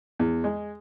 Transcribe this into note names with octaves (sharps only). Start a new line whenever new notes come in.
E2
G#3